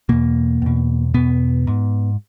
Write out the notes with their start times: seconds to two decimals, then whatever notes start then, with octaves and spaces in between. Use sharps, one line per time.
0.09 E2 B2 A#3
0.62 E2 B2
1.14 E2 B2 B3
1.67 G#2